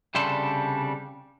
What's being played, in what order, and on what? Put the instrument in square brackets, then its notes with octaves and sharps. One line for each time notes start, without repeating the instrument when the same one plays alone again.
[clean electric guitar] C2 C#3 G3 D4 A4 C6